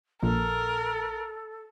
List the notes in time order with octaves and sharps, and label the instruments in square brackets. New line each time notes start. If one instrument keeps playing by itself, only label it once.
[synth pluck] A#1 A#2 [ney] A4 [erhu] A#4